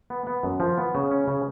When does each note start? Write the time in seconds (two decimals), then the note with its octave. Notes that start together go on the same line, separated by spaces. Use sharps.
0.10 B3
0.27 B3
0.43 F#2
0.60 F3
0.78 B3
0.95 C#3
1.11 C#4
1.28 C#3